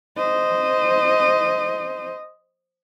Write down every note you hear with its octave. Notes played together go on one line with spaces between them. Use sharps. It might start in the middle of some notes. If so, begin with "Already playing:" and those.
C5 D#5